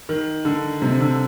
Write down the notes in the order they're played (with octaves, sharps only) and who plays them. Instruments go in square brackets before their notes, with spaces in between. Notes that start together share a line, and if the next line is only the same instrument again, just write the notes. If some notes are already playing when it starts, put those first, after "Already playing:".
[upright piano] D#3
D3
C3
D3